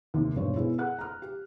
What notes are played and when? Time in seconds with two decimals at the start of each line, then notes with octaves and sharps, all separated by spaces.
0.14 D#2 C3
0.35 E1 G2 C5 C#5
0.54 B2 E4 G#4
0.78 G#4 F#5 F#6
0.99 A#5 F6
1.22 G4